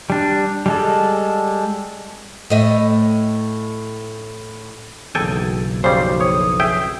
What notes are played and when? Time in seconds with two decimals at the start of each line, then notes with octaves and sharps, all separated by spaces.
0.10 G3 D4
0.66 G3 G#3 A4
2.50 A2 D#5 E5
5.15 F#1 B1 E2 A4 G5 G#5
5.84 F2 C#3 G3 C5
6.21 C#5 D#6
6.60 G#4 E5 G5